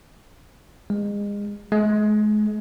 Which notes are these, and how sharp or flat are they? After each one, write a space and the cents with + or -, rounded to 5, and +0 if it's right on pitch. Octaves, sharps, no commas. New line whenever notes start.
G#3 -30
G#3 +35